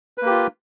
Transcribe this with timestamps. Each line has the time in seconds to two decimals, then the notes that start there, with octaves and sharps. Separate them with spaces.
0.18 B4
0.22 A#3
0.26 G4
0.30 F4